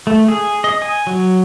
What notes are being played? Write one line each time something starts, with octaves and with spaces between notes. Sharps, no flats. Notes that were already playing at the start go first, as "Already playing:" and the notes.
A3
G#4
D#5
G#5
F#3